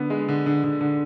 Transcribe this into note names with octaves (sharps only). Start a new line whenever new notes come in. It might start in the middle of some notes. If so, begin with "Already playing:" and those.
Already playing: D3 B3
G#3
D3
D3
D3
D3